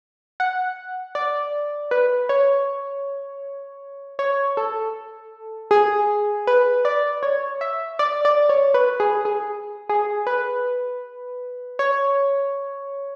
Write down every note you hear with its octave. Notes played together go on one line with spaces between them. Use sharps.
F#5
D5
B4
C#5
C#5
A4
G#4
B4
D5
C#5
E5
D5
D5
C#5
B4
G#4
G#4
G#4
B4
C#5